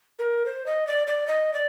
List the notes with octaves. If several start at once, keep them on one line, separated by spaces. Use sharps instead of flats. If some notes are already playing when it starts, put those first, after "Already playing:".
A#4
C5
D#5
D5
D5
D#5
D5